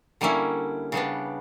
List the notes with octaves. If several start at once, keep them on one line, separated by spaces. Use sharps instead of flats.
D3 G3 A#3 C#4 E4
C#3 G3 B3 D4